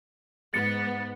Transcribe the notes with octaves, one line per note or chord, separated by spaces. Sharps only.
G#2 B3 A6 C#7